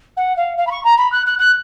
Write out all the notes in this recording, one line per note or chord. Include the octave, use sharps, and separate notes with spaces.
F#5
F5
F5
B5
C#6
A#5
B5
F#6
F#6
F#6